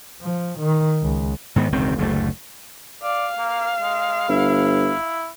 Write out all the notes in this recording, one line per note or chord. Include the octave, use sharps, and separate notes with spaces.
F3
D#3
C#2
G#2 D#3 B3
E1 C#2 D#3 C4
F#1 D2 C3 A3
D5 F5
A#3
G#3
G1 E4